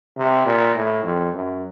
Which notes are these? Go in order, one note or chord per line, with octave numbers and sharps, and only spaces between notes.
C3
A#2
A2
F2
F#2